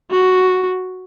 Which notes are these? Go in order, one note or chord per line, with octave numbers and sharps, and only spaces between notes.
F#4